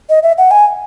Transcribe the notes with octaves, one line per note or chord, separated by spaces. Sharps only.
D#5
E5
F#5
G#5